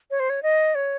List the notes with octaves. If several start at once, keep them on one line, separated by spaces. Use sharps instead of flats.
C#5
C5
C#5
D#5
C#5